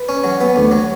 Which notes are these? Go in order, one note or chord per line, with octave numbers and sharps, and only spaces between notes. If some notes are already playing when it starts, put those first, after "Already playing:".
Already playing: B4
C#4
F#3
B3
D2
F#3